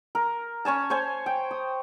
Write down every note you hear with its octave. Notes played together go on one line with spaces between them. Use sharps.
A#4
C#4 C#5 G#5 A5
C5 C#5 G#5
G5
D#6